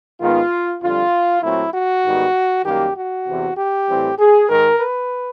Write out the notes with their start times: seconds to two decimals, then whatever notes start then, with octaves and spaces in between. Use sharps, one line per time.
0.20 G#2 D#3 G#3 B3 F4
0.82 F2 D3 G3 F4
1.42 A#2 F#3 A3 C4 E4
1.74 F#4
2.04 G#2 D#3 G3 B3
2.65 F#2 D#3 G3 A#3 G4
2.96 F#4
3.27 E2 C3 E3
3.57 G4
3.88 A2 E3 G3 C4
4.19 G#4
4.49 G#2 D#3 G#3 A#4
4.80 B4